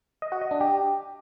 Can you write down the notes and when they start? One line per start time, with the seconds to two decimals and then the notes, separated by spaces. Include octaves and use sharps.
0.22 D#5
0.32 F#4
0.41 D#5
0.51 D4
0.61 G4